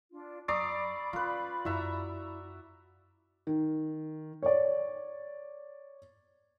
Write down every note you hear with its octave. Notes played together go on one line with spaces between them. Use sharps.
D4 F4
F#2 D5 A#5 B5 C#6 D#6 E6 C7
C#4 F4 B4
F#2 E4 F#4 E5 A#5
D#3
C#5 D5